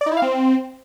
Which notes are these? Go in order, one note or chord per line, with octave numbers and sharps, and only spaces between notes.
D5
D#4
E4
F5
C4